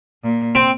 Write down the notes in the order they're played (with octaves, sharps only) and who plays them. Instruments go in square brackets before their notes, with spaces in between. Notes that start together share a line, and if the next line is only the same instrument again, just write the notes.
[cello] A#2
[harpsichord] C4